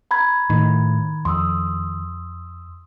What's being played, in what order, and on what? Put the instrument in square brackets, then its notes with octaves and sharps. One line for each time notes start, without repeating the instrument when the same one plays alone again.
[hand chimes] A#5 B5 G#6
[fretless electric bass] A2 [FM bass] D#3
[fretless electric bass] F2 [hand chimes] C6 D#6 E6